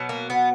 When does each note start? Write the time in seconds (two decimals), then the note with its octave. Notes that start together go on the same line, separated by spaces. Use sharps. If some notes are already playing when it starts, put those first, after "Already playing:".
Already playing: B2 F#3
0.09 A#3
0.30 B3